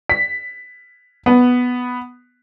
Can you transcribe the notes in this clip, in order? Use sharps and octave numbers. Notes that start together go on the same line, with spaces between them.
B6
B3